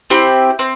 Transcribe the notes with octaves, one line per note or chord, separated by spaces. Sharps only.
C4 E4 G4
C4